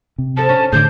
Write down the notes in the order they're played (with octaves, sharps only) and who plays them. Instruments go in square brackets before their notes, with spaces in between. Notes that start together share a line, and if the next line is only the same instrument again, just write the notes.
[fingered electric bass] C3
[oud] F3 A4 [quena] A5
[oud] C#4 D4 F#4
[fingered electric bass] A2 D3 [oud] G#4 D5 [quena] G6